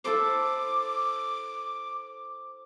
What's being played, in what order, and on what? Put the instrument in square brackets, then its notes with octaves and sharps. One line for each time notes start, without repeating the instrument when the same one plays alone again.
[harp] E4 A4 C5 [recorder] D6